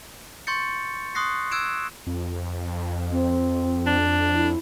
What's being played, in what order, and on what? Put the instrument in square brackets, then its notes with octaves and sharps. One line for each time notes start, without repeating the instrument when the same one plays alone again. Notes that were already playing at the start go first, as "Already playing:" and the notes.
[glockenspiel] C6 C#6 G6 A6 C#7
C6 C#6 D#6 F#6 A#6 C7
E6 F#6 G#6 D7 E7
[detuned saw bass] F2
[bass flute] C4
[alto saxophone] D4
[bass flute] E4